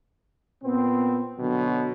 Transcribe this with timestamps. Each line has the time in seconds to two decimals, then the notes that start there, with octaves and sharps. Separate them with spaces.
0.62 A#2 B3 C4
1.39 B2 D3 F#3